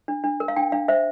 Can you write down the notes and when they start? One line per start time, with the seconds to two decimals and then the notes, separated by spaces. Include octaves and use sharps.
0.08 D4
0.24 D4
0.40 A#4
0.48 F5
0.56 D4 G5
0.72 D4 F5
0.88 C5 E5